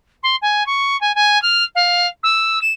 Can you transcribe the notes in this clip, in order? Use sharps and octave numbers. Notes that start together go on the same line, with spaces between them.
C6
G#5
C#6
G#5
G#5
F6
F5
E6
E7